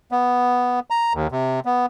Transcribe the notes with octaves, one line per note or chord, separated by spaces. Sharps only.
B3
A#5
D#2
C3
B3